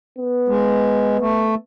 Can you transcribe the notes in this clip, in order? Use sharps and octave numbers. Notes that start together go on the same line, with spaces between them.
B3
G#3
A3